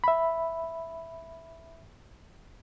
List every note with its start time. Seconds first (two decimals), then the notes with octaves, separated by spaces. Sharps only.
0.04 E5 B5